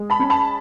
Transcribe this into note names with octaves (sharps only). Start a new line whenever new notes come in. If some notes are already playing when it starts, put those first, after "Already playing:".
Already playing: G#3
A5 B5
C#4
A5 B5